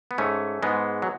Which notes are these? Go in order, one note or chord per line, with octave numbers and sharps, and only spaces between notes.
B3
G#2 A3 C#4
G#2 G#3 B3
F#3